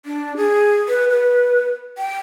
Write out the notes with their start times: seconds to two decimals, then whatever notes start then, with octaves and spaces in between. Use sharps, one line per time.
0.06 D4
0.37 G#4
0.88 B4
1.10 B4
1.98 G5